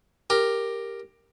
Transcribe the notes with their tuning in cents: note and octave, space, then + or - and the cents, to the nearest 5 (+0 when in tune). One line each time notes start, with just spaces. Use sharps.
G4 +10 A#4 +0